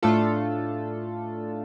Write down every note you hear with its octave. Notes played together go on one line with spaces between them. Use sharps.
A2 A3 D4 F4 A4